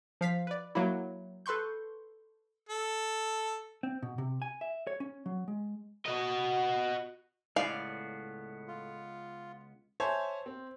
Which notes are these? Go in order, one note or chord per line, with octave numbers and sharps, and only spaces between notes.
F3 F5 B6
B4 D5
F#3 A#3 E4
A4 B4 C6 C#6 G6
A4
C4
B2
C3
G#5
E5
C#5
C#4
F#3
G#3
F#4 D#5
C#2 A2 B3 C5 D5 F5
F4
C5 C#5 E5 G#5 A5
C4